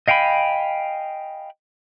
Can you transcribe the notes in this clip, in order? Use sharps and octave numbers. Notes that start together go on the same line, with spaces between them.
D#5 F5 G5 G#5 B5